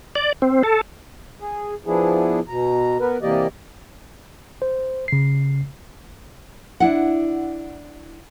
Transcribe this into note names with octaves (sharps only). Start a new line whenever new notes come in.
D5
C4
A4
G#4
F3 B3 D4 E4 G#4
B2 A#5
B3 A#4 B4
C3 E3 A#3 G4 D5 D#5
C5
C#3 C7
D4 E4 F#5